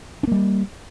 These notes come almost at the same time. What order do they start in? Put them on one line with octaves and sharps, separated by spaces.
D4 A#3 G3